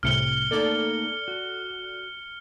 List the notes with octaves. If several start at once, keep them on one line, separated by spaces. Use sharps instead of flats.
C2 A2 C3 F6 C#7 G7
A3 A#3 D#4 A4 D5
F#4